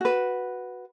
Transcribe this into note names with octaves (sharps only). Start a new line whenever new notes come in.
F#4 B4